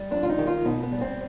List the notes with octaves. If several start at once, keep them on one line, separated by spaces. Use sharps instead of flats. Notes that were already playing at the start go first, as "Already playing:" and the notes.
Already playing: G3
F2 D4
F4
D#4
D#3 G4
F4
B2 D#4
B3
G3
C4